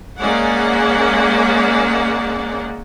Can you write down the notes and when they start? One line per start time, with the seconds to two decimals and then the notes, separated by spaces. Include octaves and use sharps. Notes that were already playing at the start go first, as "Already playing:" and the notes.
0.18 G#3 A#3 C#4 D5 F#5